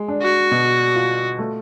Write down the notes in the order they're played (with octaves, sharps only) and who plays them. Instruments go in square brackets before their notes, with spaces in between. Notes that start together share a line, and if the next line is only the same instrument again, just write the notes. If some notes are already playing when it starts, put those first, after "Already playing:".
Already playing: [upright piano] G#3
D4
[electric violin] F#4
[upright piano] B2
F4
A3